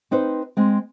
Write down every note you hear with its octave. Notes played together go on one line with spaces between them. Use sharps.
C4 D#4 B4 C5
G#3 C4